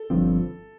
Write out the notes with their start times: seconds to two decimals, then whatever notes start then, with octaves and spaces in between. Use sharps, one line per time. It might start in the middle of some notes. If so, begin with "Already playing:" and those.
Already playing: A4
0.10 G1 G2 F3 C4